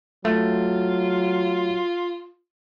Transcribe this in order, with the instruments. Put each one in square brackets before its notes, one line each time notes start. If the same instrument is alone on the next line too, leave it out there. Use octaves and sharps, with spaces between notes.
[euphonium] F#3 [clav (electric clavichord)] A3 [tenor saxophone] F4